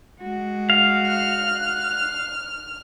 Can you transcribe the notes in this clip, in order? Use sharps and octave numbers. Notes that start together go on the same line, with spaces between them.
G#3 F#4
F5
F6 F#6